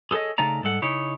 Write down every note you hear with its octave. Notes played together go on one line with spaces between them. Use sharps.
G#4 A4 B4 C#5 D#5
C#3 A3 D#4 D5 A#5
G#2 G3 A4 F#5
C#3 D#4 E4 C#5